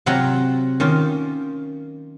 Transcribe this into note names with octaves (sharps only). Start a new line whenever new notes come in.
C3 F#3 C4 F4 F#5 A#5
D#3 A#3 C#4 F4